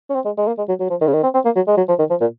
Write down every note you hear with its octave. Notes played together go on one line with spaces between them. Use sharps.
C#4
C4
G#3
G#3
A#3
G#3
F#3
F#3
F3
D#3
C#3
D#3
C4
C4
A#3
F#3
G#3
F#3
F3
D#3
F3
A#2